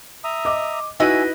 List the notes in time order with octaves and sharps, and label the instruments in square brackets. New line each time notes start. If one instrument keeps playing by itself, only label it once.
[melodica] E5 A#5 D#6
[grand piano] D#5 D6
[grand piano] D#4 F#4 [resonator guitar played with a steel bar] E4 B4 D#5 [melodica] E5 G#5